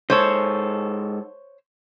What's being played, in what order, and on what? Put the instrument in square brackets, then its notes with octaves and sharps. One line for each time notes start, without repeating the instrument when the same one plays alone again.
[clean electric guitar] G#2 A4 [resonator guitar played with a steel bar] C5 C#5